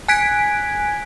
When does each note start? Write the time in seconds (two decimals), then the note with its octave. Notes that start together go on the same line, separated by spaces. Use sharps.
0.08 G#5 F#6 G#6 B6 D7